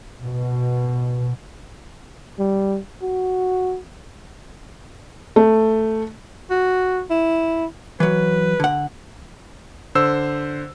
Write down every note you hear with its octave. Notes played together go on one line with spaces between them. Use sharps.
B2
G3
F#4
A3
F#4
E4
E3 F#3 B4
D3 F#5
D3 C5 E6